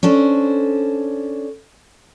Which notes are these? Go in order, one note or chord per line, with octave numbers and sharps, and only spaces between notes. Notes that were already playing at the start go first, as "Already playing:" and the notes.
C#4 D4 A4 C5